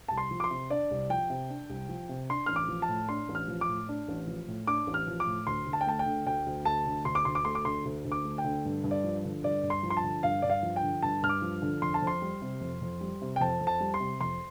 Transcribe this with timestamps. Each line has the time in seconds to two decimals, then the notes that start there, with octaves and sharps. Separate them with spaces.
0.08 C2 A5
0.18 C6
0.31 F3
0.40 D6
0.44 C6
0.51 C3
0.70 D4 D5
0.91 C2
1.10 F3 G5
1.30 C3
1.50 D4
1.70 C2
1.89 F3
2.09 C3
2.30 D4 C6
2.46 A1 F6
2.56 D6
2.68 F3
2.82 A5
2.88 A2
3.09 D4 C6
3.29 A1
3.35 F6
3.48 F3
3.61 D6
3.68 A2
3.89 D4
4.08 A1
4.27 F3
4.47 A2
4.67 D4 D6
4.87 A1
4.94 F6
5.07 F3
5.20 D6
5.26 A2
5.47 D2 C6
5.67 D2
5.73 A5
5.81 G5
5.87 A3 A5
5.99 G5
6.06 D3
6.26 D2 G5
6.46 D2
6.65 A3 A5
6.86 D3
7.05 D2 C6
7.15 D6
7.25 D2 C6
7.35 D6
7.45 A3 C6
7.55 D6
7.65 D3 C6
7.85 D2
8.05 D2
8.12 D6
8.24 A3
8.38 G5
8.44 D3
8.65 G2
8.84 G2
8.91 D5
9.04 F3
9.24 D3
9.44 G2 D5
9.63 G2
9.70 C6
9.83 F3
9.90 C6
9.97 A5
10.03 D3
10.23 G2 F5
10.42 G2 D5
10.50 F5
10.63 F3
10.76 G5
10.82 D3
11.02 G2 A5
11.23 G2 F6
11.29 D6
11.42 F3
11.62 D3
11.82 F2 C6
11.94 A5
12.02 F2
12.07 C6
12.22 G3
12.42 C3
12.61 F2
12.82 F2
13.01 G3
13.21 C3
13.36 G5
13.40 F2 A5
13.61 F2
13.67 A5
13.80 G3
13.94 C6
14.00 C3
14.21 F2 C6